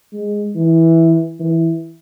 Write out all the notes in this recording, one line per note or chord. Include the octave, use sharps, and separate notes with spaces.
G#3
E3
E3